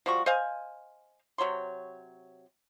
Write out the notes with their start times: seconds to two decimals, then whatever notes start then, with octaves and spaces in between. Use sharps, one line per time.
0.06 F3 G3 F#4 C#6
0.26 C5 D#5 F5 G#5
1.38 C3 F#3 C#5 C6